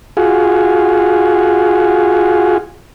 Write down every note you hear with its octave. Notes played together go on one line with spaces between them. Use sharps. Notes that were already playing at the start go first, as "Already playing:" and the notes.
F4 F#4 G#4